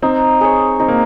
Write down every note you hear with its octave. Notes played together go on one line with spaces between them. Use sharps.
C4 D#4
G#4 C#5
C4 D#4
A#3